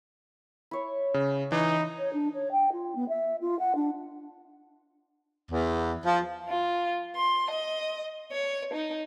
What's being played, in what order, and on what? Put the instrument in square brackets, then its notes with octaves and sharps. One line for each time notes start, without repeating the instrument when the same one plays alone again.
[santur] E4 C#5
[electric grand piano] C#3
[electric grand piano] E3 [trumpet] D#4
[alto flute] C#5
D4
C#5
G5
F4
B3
E5
F4
F#5
D4
[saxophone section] E2
F3
[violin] F4
C6
D#5
C#5
D#4